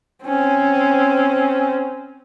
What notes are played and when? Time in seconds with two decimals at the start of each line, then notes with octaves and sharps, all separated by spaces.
0.24 C4 C#4